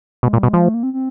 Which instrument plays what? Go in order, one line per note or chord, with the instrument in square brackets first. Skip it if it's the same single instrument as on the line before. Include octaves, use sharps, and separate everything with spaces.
[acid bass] B2 [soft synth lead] G#3
[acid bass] A#2
[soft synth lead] G3
[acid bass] B2
[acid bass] F3 [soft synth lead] G#3
[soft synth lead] A3
A#3
C4
C4